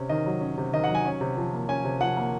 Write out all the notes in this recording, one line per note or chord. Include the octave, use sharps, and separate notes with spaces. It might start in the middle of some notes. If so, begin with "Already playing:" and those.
Already playing: C3 C#4
D#3 D#5
F#3
C#4
C3
D#3 D#5
F#5
F#3
G#5
C#4
C3
F3
A#3
C#4 G#5
C3
F3 F#5
A#3